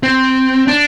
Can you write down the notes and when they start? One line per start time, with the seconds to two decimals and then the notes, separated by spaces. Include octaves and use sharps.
0.03 C4
0.68 D4